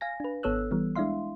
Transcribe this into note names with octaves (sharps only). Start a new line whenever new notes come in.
F5 G#5 A#6
D4 B4
G#1 B3 A4 C#5 E6 F#6
E3 G3 B3
G#3 D4 E4 E5 F5 C6